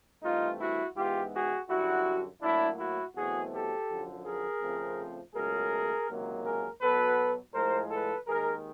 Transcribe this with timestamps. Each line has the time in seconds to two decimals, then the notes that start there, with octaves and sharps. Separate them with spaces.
0.22 G2 E3 A3 C4 D#4 F4
0.59 E4 F#4
0.95 G#2 E3 G#3 B3 F4 G4
1.32 F#4 G#4
1.69 F#2 D3 G3 E4 F#4
2.42 A2 F#3 A#3 D4 E4
2.78 E4 F#4
3.15 E2 B2 F#3 A3 C4 F#4 G#4
3.51 G4 A4
3.88 F#2 D3 F3
4.25 G#4 A#4
4.61 F2 C#3 F3 A3 C4
5.35 C#2 B2 F#3 A3 G#4 A#4
6.08 C#2 C3 D#3 F#3 A#3
6.44 G#4 A#4
6.80 B2 F#3 B3 A4 B4
7.54 A2 F3 G#3 A#4 C5
7.91 A4 B4
8.27 D#2 D#3 G#3 G#4 A#4